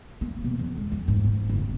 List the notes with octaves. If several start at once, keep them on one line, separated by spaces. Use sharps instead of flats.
A#3
B2
F2
G#3
F2
G#2
G#2
F#1
C4